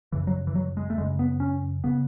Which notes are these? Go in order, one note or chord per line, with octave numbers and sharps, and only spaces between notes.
F#2 C#3 E3
F#3
E3
F#3
G#3
A3
F#2 C#3 G#3
B3
C#4
C#3 B3